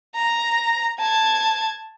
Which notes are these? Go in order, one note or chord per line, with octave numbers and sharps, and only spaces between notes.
A#5
A5 G#6